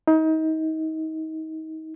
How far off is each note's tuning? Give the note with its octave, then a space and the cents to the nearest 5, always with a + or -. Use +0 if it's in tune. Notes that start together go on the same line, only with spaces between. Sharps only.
D#4 +30